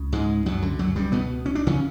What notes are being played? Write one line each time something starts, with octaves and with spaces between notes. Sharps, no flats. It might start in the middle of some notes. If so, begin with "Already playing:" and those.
Already playing: C#2 C#3
G#2 G#3
F#2 F#3
D3
F#2 F#3
G2 G3
B2 B3
C#4
D4
C#3 C#4